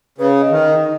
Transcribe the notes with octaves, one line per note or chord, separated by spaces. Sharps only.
C#3 B4
D#5
D#3